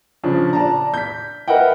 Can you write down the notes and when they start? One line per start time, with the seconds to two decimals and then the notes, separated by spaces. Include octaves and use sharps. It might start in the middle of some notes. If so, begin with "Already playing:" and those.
0.24 C#3 F3 C#4 D4
0.53 D5 A5 A#5
0.94 G6 B6
1.48 A#4 B4 D#5 E5 F#5 G5